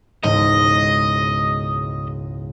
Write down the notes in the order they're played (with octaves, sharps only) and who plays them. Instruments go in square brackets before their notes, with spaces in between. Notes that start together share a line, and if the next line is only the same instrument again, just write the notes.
[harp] E1 C#2 G#2 [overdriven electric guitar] D#5